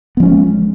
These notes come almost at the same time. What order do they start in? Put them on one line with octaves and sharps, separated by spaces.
B3 F3 C#4 G#3